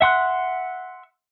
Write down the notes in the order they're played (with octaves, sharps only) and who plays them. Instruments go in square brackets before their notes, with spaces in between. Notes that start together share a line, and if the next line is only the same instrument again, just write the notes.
[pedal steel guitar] E5 F#5 C6 F#6